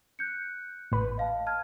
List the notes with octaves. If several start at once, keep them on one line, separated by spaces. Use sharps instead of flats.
F#6 G6 C#7
A1 B4
D#5 F5 A5
A5 F6 G#6